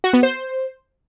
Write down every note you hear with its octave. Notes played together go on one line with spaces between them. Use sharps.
F#4
B3
C5